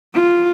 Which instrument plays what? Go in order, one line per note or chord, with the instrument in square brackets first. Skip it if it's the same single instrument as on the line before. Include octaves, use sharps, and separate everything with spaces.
[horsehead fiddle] F4